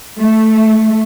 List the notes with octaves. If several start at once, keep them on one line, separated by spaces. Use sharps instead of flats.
A3